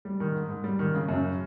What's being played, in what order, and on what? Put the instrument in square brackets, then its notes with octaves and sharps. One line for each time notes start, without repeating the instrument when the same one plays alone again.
[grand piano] G3
D#3
G#2
G#2
G3
D#3
C#3
F#2